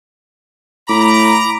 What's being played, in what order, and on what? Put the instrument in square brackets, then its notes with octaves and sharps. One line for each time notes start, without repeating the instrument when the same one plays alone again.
[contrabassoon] A2 [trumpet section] A#5 [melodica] B5 D6